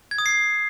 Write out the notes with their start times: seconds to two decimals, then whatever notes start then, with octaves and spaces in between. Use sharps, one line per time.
0.11 G#6
0.18 D#6
0.26 C7